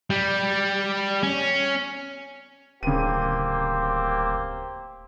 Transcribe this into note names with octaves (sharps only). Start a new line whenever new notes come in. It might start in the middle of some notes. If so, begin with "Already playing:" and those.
G3
C#4
D1 C#3 A#3 C4 G4 D#7